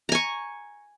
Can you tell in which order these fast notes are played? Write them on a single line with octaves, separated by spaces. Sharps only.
A#5 G#5 C#6